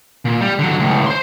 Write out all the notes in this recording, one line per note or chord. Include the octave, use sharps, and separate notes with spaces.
A#2
G3
D3 F#3
C#2 A2
C5 C6